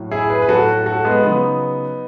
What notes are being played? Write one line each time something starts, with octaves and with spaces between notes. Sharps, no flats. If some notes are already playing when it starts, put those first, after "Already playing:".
Already playing: A2 F#3
E4 G#4
G#4 B4
B4
A2 F#3 F#4 A4
F#4 A4
G#3 B3
C#3 F#3 B3 D#4